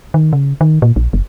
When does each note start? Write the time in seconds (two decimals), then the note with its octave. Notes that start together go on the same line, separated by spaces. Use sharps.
0.14 D#3
0.33 C#3
0.61 D#3
0.82 A#2
0.96 A#1
1.13 F#1